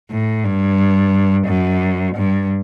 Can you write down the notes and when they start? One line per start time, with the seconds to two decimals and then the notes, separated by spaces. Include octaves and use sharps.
0.10 A2
0.44 G2
1.47 F#2
2.15 G2